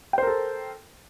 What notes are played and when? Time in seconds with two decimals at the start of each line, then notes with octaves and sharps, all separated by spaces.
0.13 G5
0.18 C5
0.23 A#4
0.27 A4